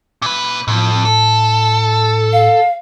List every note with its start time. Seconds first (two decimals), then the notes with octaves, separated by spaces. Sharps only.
0.22 A#2 B4
0.68 F2 A2
1.05 A4
2.33 F5